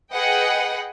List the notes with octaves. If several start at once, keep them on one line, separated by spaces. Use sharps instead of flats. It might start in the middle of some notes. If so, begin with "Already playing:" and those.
G#4 B4 D#5 F#5 G5